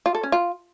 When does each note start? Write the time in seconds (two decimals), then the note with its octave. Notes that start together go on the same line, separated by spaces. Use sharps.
0.06 F4
0.15 A4
0.23 C#4
0.32 F4